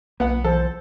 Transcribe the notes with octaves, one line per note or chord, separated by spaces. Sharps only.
B1 A#3 B3 F#5
E3 A4 C5